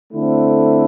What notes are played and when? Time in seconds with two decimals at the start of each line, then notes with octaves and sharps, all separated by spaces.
0.13 D3 A3 C4 E4